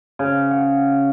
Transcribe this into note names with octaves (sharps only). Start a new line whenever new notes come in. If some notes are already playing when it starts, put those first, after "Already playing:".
C#3
F#5